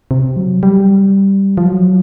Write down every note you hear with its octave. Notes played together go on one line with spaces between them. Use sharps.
C3
F#3
G3
F3
F#3